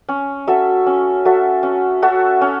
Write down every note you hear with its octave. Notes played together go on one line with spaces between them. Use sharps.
C#4
F#4 A4 E5
C#4
F#4 A4 E5
C#4
F#4 A4 E5
C#4